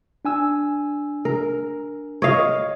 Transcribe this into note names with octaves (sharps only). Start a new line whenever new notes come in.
D4 G#5 E6
A#4
C#5 D#5 F5